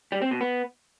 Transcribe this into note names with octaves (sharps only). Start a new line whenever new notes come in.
G3
C4
B2
B3